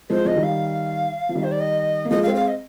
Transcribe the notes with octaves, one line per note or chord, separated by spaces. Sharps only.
F3 G#3 C5
F3 D#5
D#3 G3
F5
F3
D#3 G3
C5
D5
D#5
A#3
F3 G#3 D#5
F5
G#3 C4
F5
D#5